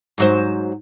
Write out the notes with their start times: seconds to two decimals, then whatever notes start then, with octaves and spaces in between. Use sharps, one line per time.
0.18 G#2 F#3 C5